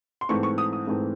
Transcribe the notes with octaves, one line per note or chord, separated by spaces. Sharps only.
C6
G#2 E3 A3 C4 C#6
C#6
D#6
D#6
G#2 E3 A3 C4